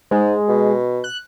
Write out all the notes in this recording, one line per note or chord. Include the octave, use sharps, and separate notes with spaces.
G#2 G#3
B2
F#6